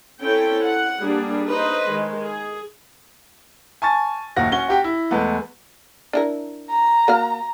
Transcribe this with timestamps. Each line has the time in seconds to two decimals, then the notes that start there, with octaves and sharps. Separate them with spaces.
0.21 C4 C#4 E4 A4 G5
0.65 F#5
1.01 G3 A#3 D4 G#4
1.48 D#4 B4 C5 D#5
1.88 D#3 G#3
2.23 G#4
3.82 G#5 A5 C#6 A6
4.36 F#1 D#2 F#4 A#6
4.52 C#4 F#4 G7
4.68 F#4 G4 G5
4.84 E4
5.11 E2 G#3 A3 B3
6.13 D4 E4 A#4
6.70 A#5
7.08 A#3 F#4 F5